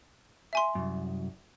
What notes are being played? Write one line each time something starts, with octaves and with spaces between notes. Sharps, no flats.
E5 G#5 C6
C2 F#2